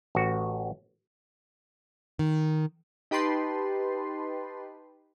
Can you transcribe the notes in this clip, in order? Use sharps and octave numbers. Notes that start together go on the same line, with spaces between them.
A1 F#4
D#3
D#4 G4 B4 A5 C6